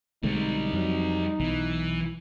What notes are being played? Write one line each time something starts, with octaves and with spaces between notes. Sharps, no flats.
B1 D3 G3 G#3 C4 D#4
F2 F#3
B1 E3